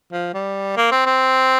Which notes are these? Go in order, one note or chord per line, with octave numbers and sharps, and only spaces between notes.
F3
G3
A#3
C4
C4